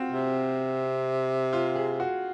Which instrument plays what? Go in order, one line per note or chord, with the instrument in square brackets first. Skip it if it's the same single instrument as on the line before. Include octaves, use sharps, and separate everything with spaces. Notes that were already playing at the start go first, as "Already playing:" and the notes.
Already playing: [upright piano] C4 F4 F#4
[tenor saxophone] C3
[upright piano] F4
G#4
F#4